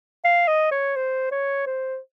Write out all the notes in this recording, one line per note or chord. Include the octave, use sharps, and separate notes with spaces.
F5
D#5
C#5
C5
C#5
C5